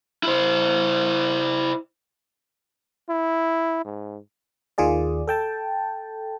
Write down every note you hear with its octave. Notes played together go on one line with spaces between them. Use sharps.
E4 C5
E4
G#2
D#2 D#3 F4 G#4 D5
A4 G5 A5